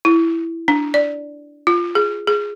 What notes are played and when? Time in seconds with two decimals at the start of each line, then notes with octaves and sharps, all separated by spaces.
0.05 E4
0.68 D4
0.94 D5
1.67 F4
1.95 G#4
2.27 G#4